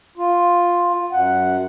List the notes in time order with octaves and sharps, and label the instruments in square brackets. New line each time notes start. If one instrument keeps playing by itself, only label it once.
[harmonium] F4
[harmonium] F#2 [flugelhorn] F#5